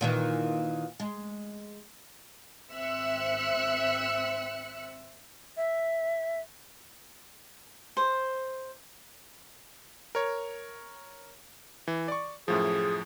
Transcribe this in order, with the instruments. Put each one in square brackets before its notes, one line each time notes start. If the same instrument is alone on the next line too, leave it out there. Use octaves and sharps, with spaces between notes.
[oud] A#2 D#3 E3
G#3
[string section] G#1 C4 E5 E6 F#6 C#7
[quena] E5
[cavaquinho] C5
[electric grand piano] A#4 C#5
E3
D5 C#6
[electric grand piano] F#2 A2 F3 [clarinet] G#4